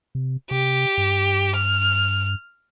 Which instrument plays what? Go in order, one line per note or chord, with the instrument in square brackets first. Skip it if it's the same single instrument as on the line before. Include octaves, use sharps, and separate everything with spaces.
[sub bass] C3
[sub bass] C3 [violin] G4
[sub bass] G2
[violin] F6